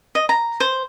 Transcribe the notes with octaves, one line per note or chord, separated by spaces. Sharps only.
D#5
A#5
C5